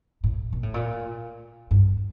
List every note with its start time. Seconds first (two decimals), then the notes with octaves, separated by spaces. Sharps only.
0.24 A2
0.53 A#2
0.63 A2
0.74 A#2
1.71 G2